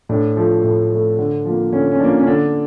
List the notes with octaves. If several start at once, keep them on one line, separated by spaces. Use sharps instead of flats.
A2 D4
F3 A3
A2
F3 A3
D3
F3 A#3
D3 C#4
C#4
F3 A#3 D4
C#4
D3 D4